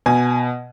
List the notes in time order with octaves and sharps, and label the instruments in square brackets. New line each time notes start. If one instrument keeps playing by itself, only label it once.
[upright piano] B2 G#5